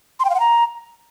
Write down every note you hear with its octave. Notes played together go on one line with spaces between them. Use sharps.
C6
G5
F5
F#5
A#5